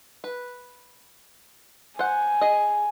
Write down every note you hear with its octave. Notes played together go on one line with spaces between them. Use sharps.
B4
C5 F#5 G#5
G#4 D#5